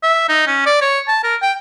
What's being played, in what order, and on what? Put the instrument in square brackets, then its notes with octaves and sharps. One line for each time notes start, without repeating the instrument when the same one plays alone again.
[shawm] E5
D#4
C#4
D5
C#5
A5
A#4
G5